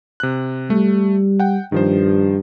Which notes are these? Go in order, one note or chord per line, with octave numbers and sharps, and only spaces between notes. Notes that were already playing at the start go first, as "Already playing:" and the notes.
C3 F#6
G3 A3
F#5 G5
G2 D#3 F3 C5